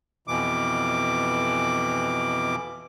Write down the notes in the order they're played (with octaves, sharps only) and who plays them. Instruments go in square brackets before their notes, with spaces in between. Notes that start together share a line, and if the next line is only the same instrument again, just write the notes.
[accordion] F2 B2 E3 D6